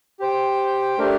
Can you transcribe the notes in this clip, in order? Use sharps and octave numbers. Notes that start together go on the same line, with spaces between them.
G4 C5 G5
A3 D4 G4 A#4